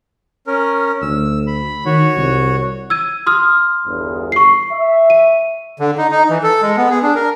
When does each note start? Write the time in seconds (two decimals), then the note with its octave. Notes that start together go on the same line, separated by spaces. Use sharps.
0.47 C#4 A#4
1.02 D2 E6
1.47 B5
1.85 D#3 F#4 C#5
2.17 C2
2.90 E6 G#6 D#7
3.26 C6 D#6 F6
3.86 G1 E2
4.32 C#6 C7
4.72 E5
5.10 D#7
5.80 D3
5.98 D#4
6.11 D#4
6.29 E3
6.43 A4
6.62 G#3
6.77 B3
6.90 G#4
7.02 D4
7.16 A#4